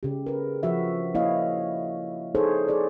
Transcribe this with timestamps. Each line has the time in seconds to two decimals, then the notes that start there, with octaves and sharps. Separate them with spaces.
0.03 C#3 G4
0.27 A#4 B4
0.63 F3 F#4 E5
1.15 A#3 E4 C#5 D#5 F5
2.35 D#4 G#4 A4 C5 C#5
2.68 G#4 C5 D5